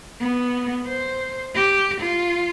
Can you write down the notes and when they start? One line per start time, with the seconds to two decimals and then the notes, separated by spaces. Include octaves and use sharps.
0.21 B3
0.86 C5
1.55 G4
2.01 F4